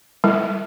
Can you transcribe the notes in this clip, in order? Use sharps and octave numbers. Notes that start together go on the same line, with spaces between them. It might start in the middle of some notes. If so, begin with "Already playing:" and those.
G3